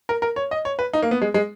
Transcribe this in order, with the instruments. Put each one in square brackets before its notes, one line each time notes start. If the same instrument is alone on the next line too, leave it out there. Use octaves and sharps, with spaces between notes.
[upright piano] A#4
A#4
C#5
D#5
C#5
B4
D#4
A#3
B3
G#3
G#3